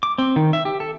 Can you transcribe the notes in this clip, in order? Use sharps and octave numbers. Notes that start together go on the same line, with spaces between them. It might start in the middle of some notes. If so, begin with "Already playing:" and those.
D6
C4
D#3
E5
G4
A4